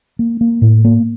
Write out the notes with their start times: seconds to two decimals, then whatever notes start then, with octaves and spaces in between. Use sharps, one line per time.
0.19 A#3
0.41 A#3
0.62 A2
0.84 A#3